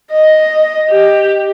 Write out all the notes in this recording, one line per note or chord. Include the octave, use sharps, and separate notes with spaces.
D#5
G4